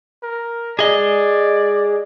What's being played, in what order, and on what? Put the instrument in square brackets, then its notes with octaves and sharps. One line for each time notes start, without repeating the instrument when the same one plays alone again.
[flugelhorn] A#4
[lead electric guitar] G#4 D#5 [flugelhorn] D5